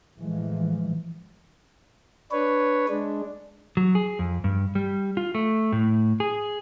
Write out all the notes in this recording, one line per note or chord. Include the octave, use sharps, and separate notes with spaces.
A2 E3 F3 G#3
D4 B4 C#5
G#3 D4
F#3
G#4
F2
G2
G3
F4
A3
A2
G#4